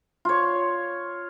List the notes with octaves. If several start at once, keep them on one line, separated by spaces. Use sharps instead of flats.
F4 C#5